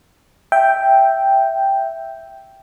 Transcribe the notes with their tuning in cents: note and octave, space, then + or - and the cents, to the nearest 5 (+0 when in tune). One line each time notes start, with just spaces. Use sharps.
E5 +0 G5 +0